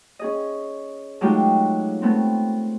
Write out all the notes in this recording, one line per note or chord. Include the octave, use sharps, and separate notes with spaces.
C#4 G#4 D#5
F#3 G#3 A3 D#4 F4 G4
A3 B3 C4